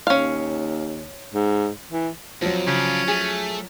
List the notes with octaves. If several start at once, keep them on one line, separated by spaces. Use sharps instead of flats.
D#2 C#4 F5
G#2
E3
F2 F3 F#3
C#3 C#4 D4 F4
A3 G#4